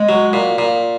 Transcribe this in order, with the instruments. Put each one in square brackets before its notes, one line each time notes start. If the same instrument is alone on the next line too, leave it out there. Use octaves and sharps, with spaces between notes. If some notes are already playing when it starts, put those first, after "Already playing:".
Already playing: [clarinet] G#3
[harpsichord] F#3
A#2
A#2